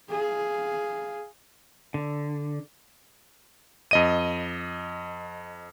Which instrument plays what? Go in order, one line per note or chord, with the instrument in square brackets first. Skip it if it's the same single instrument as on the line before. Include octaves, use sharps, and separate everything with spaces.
[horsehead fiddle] G#4 F5
[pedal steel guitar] D3
[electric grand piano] F2 D#5 D#7